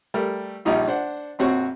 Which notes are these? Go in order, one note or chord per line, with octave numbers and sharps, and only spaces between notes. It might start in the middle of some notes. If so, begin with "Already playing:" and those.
G3 A3 A#4
A#1 G3 D#4 F4
D4 C5 F#5
A#1 F2 C4 F#4 C#5 C#6